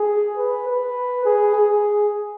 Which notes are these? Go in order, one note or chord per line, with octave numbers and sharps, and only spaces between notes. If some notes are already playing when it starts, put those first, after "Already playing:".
Already playing: G#4
B4
B4
G#4
G#4